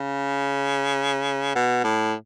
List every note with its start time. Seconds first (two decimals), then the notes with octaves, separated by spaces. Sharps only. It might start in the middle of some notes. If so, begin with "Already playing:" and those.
Already playing: C#3
1.55 B2
1.84 A2